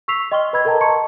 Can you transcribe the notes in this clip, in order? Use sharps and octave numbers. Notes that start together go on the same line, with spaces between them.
C#6 E6 B6 C7 F7
D#5 G5 C6 C#6 F6 G7
B4 D#5 B5 E6 G#6
A4 A#4 D#5 G5 A5 A#5
D#5 A5 A#5 C6 C#6 C#7